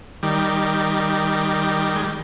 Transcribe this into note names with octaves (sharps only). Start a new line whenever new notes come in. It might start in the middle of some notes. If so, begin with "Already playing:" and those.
D#3 G3
G#3
G3